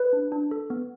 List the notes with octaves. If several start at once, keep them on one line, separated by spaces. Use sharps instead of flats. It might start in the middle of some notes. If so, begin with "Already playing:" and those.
Already playing: B4
D4
D4
A4
B3